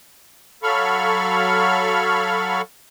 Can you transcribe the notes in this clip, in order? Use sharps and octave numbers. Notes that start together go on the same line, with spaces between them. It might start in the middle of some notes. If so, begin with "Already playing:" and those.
F#3 A4 F5 B5 C#6 F6